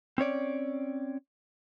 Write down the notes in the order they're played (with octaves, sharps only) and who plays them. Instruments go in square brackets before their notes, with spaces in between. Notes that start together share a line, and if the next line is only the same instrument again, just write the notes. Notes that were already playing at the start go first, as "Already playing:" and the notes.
[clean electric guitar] C4 C#4 C#5 D5